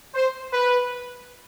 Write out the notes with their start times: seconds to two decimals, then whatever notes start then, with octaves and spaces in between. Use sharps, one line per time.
0.15 C5
0.54 B4